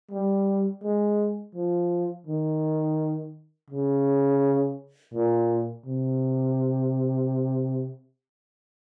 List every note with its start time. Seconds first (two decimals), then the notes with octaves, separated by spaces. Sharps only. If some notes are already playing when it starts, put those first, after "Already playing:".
0.11 G3
0.83 G#3
1.55 F3
2.27 D#3
3.70 C#3
5.14 A#2
5.86 C3